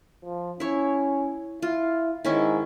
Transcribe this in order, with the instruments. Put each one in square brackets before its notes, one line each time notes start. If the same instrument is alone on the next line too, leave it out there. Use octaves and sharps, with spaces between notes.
[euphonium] F3
[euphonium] C#4 [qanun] E4 C#5
[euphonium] E4 [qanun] F4
[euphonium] G#2 [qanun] D#3 C#4 E4